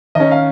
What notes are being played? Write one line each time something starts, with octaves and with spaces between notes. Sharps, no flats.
D#3 C#4 D#5
F5